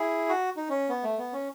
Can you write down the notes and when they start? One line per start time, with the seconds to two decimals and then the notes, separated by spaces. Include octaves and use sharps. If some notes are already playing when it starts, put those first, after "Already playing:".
Already playing: E4 G#4
0.29 F#4
0.57 D#4
0.69 C#4
0.89 B3
1.03 A3
1.18 B3
1.33 C#4